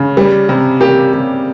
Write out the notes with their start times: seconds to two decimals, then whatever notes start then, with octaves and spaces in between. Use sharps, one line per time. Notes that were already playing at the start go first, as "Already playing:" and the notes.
Already playing: C#3
0.17 G3
0.49 C3
0.81 A#3 G4
1.13 C3